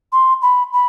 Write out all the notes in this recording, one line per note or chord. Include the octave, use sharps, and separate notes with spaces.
C6
B5
B5